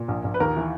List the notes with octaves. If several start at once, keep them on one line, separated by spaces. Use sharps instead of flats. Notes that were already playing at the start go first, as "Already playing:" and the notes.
Already playing: A#2
A#1
A#1
B4
D#2 A#4
E3